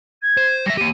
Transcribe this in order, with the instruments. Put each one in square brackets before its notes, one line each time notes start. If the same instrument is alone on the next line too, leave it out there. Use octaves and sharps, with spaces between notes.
[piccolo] G#6
[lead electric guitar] C5
[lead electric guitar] G3 E5 [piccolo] A#6
[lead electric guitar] A#3 G4 [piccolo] D#7